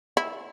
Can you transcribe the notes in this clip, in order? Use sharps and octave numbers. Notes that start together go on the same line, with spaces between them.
E4